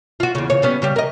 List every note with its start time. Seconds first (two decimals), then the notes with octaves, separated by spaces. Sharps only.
0.20 F4 F#4
0.35 E2 C#3
0.50 C#3 C#5
0.62 G3 B3 C#4
0.82 C#3 G3 G4
0.96 A#4 D#5